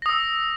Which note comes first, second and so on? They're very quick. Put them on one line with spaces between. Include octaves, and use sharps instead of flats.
A#6 D#6 E6